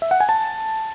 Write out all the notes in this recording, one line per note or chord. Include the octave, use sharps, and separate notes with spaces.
E5
F#5
G#5
A5